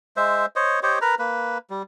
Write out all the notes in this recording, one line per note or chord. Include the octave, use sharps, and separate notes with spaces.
G#3 C5 E5
C5 C#5 D#5
G4 C5 C#5 D#5
A#4 B4 A#5
A#3 B4
G3